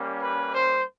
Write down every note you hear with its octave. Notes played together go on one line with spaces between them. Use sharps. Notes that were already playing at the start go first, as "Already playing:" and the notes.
Already playing: G3 A#3 C#4
B4
C5